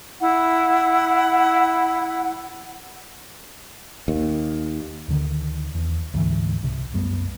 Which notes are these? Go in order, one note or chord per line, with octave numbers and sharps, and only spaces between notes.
E4 F#5
D#2
D2 D3 D#3
E2
D2 G#2 E3
C2 C3
C2 F#2 G3 B3